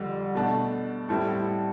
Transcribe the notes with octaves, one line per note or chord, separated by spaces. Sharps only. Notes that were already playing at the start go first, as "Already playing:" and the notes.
Already playing: F2 D3 G3
B2 A3 D4
A2 G3 C4 E4 A4